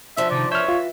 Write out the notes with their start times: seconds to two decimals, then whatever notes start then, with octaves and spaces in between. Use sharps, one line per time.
0.17 B2 F3 D4 E5
0.31 C3 D#3 D5
0.52 B4 C#5 E5 F6 G6
0.68 F4